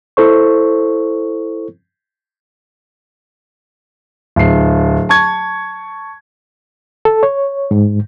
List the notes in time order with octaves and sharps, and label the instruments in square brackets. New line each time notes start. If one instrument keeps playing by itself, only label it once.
[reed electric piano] E4 A4 C5 C#6
[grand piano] D1 C7
A5 C#6 G#6
[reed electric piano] A4
C#5
G#2